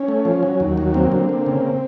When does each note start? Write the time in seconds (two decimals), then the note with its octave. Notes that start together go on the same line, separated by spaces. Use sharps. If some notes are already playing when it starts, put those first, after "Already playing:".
Already playing: C#4
0.08 A3
0.25 F3
0.43 F#3
0.60 D#2
0.77 F#3
0.94 A#3 C4
1.12 D3
1.29 A#3
1.46 C#3